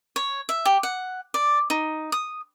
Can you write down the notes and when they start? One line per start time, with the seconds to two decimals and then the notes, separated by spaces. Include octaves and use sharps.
0.16 C#5
0.49 E5
0.65 G4
0.83 F#5
1.34 D5
1.70 D#4
2.12 D#6